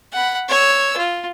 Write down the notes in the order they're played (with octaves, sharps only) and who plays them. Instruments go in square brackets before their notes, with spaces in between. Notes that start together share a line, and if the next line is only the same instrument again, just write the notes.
[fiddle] F#5 B5
C#5 E6
F4